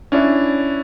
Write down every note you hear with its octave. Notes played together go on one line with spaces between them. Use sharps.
C#4 D4 E4